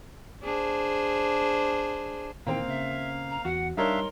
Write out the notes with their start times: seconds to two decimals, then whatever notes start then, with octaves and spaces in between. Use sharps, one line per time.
0.43 D4 G#4 C5
2.47 A#2 D#3 E3 A#3 C4 A#4 F5 G5
2.68 C#3 E5
3.29 A#5
3.45 E2 F#4 F#5
3.77 G3 D4 D#4 A#4 C#5 E5 F5 C6